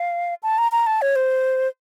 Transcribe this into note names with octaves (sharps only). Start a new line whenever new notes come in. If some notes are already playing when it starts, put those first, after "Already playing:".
Already playing: F5
A5
A#5
A#5
A5
C#5
C5